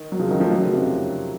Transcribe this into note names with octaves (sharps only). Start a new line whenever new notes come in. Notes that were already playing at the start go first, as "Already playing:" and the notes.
Already playing: D#3
F#3
C#3 F3
D#3 F#3
F3 A3
D#3 F#3
C#3 F3
C3 D#3